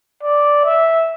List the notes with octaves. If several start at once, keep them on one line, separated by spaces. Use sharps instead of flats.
D5
E5